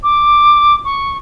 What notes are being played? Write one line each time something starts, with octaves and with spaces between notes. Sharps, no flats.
D6
C#6